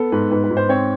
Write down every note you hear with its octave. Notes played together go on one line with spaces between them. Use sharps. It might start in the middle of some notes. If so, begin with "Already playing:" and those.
Already playing: B3 A4
G#2 B4
G#2 B4
B4
G#2
C5
C4 C#5